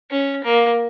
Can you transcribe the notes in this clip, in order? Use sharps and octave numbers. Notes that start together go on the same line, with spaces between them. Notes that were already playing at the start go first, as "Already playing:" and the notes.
C#4
A#3